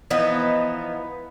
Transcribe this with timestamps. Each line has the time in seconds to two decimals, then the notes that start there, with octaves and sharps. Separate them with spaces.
0.10 E3 F3 B3 D#4